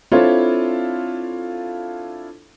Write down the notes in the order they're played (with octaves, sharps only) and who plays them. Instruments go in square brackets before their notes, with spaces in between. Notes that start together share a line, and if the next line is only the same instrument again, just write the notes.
[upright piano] C4 D4 E4 F4 A4 C#5